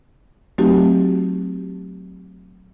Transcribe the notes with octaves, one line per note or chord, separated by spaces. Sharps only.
F#3 A3 C4 D#4 F#4 G4